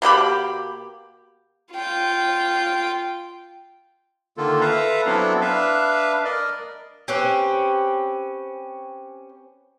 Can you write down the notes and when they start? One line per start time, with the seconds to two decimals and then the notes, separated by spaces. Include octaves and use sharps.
0.02 B2 A#3 G4 B5
1.74 F4 G5
4.37 D3 D#3 A#3 F4 A4
4.61 A4 B4 E5 F5 A#5
5.06 F#3 B3 C4 D4 E4 A4
5.41 D4 B4 E5 F5
6.25 A#4 D5 D#5
7.08 C4 C#4 G4 B4